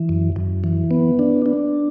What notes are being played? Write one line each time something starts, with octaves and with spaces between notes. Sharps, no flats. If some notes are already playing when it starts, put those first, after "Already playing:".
Already playing: E3
F#2
F#2
E3
B3
D4
D4